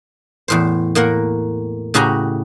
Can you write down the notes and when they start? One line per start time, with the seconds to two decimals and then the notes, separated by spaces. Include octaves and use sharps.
0.48 E2 A2 C5
0.95 A2 A#3 A#4 F#5
1.94 A2 C#3 F#4 G4 G#5 A#5